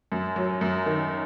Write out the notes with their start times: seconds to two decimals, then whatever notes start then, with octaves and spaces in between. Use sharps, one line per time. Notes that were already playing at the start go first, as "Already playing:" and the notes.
0.12 F#2
0.36 F#3
0.61 F#2
0.86 D#3